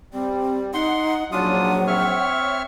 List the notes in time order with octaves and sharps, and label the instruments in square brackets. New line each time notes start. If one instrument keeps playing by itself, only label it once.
[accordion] G3 [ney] C4
[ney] D#4 [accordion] F#5 [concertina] C6
[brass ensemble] A#1 G#2 F#3 [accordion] C#4 [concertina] D4 F4 D#6 [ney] F#5
[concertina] C4 C#6 F6 [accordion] C#5 E5